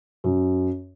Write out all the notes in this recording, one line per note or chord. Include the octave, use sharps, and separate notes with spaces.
F#2